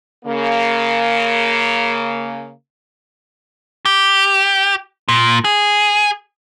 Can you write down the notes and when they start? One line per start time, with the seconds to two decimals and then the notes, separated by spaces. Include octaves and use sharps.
0.25 C#3 A#3
3.86 G4
5.09 A#2
5.45 G#4